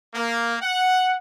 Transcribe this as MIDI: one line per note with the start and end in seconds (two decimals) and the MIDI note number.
0.14 0.56 58
0.62 1.16 78